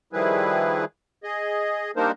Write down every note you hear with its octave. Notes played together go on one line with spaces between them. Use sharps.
D#3 F3 G3 E4 G#4 B4
G#4 D#5
G3 A#3 D4 D#4 A#4 C5